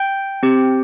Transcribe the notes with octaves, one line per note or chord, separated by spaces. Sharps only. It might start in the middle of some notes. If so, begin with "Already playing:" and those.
Already playing: G5 G6
C4 G4